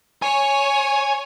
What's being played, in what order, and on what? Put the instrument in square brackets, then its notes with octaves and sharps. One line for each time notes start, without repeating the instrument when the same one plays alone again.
[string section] C#5 [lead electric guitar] G#5